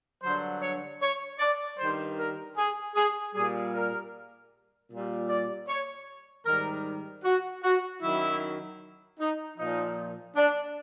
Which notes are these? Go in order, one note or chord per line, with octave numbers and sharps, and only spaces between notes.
G2 D3 F#3 C5
C#5
C#5
D5
G2 D#3 G3 C5
A#4
G#4
G#4
A#2 G3 G#4
A#4
A#2 G3
D5
C#5
G#2 D#3 G3 A#4
F#4
F#4
F#2 D#3 F#3 E4
D#4
A#2 F3 D#4
D4